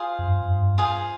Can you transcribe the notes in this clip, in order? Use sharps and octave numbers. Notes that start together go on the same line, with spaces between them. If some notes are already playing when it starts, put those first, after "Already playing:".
Already playing: F4 G#4 C5 F5
F2
G2
F2
G2
F4 G#4 C5 F5